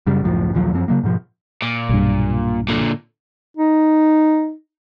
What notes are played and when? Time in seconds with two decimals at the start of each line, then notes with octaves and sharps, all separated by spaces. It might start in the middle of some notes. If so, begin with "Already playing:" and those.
0.07 F#2 C#3 G3
0.23 C#2 F#2 A2 F3
0.54 A#1 D#2 F3 F#3
0.73 F#2 F3 C4
0.88 C#3 F#3 A#3
1.04 G#2 B2 F3
1.62 A#2
1.89 B1 G2
2.69 A#2 D3
3.57 D#4